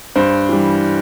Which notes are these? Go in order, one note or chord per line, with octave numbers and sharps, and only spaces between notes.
G2 C5
E3 G3